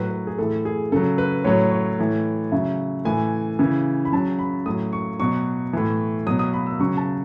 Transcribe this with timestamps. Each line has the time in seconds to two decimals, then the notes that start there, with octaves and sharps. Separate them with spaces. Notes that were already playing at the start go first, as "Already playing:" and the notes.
Already playing: A2 F#3 B4
0.11 B4
0.27 G#4
0.38 A2 E3 A4
0.65 G#4
0.92 C#3 F#3 A4
1.18 B4
1.44 A2 F#3 C#5
1.71 C#5
1.99 A2 E3
2.52 C#3 F#3 E5
3.05 A2 E3 G#5
3.59 C#3 E3
4.05 B5
4.12 C#3 F#3 A5
4.39 B5
4.65 A2 F#3 D#6
4.93 C#6
5.20 B2 F#3 C#6
5.73 A2 E3
6.26 F#3 D#6
6.30 B2
6.39 D#6
6.53 B5
6.67 E6
6.79 C#3 F#3 C#6
6.97 A5